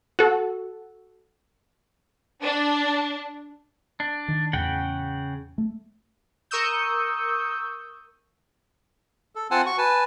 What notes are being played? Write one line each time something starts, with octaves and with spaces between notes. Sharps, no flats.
F#4 A4
D4
D4
D#3
E2 A2 C#3 F#5 G5
A3
A#4 C#6 D#6 E6 G6
A4
C4 F4 F#5 G#5 A5
F#4 C#6
B4 G#5 A5